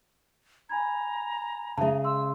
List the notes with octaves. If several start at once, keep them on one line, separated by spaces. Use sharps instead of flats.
G#5 A#5 B5 G#6
C#3 G#3 E5 A5
C6 E6